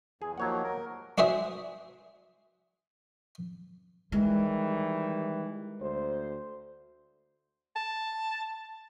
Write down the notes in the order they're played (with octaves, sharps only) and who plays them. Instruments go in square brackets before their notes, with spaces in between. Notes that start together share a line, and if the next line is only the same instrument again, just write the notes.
[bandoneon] E2 E3 [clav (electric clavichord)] G#4
[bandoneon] D#2 F3 A#3 [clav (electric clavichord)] F#3 C#5 F#5
[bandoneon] A#4
[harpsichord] D4 F#4 G#4 C5 E5
[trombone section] D#3 E3 G3 [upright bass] G#3
[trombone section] D2 C5
[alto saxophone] A5